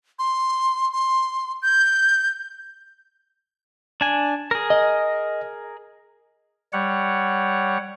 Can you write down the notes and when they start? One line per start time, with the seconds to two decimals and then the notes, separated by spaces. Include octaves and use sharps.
0.19 C6
0.92 C6
1.62 G6
4.01 D4 G#5
4.51 G#4 A#4
4.70 D#5
6.73 G3 C#5 F#5